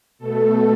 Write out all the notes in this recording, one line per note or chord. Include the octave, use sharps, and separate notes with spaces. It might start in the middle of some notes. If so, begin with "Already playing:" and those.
B2 A3 A4